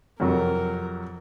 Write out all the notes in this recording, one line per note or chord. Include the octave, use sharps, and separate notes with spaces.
F2 C3 F#3 A#4